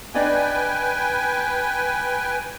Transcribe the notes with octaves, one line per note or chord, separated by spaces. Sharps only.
D4 B4 D5 D#5 G5 G#5